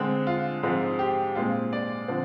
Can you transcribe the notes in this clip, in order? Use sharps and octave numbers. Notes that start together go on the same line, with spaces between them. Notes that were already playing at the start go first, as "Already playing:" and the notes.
Already playing: D3 G#3 C4
F4
G#2 F3 G#3 C4
G4
A#2 G#3 C4 F4
D5
D3 F3 C4